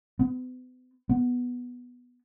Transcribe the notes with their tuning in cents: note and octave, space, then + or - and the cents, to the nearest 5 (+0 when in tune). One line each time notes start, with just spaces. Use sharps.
B3 +40
B3 -5